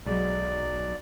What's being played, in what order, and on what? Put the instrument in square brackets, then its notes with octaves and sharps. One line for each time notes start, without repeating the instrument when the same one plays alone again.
[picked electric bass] B1 [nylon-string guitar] F#3 G#3 [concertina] D5